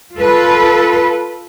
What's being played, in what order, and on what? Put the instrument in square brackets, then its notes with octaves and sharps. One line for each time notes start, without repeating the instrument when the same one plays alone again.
[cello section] F4 A4 B4